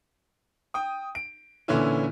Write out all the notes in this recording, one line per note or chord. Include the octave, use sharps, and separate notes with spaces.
G5 D#6
D7
A#2 D3 E3 C#4 E4